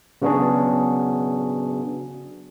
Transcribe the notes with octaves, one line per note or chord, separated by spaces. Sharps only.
C#3 F#3 B3 D4 F#4 G#4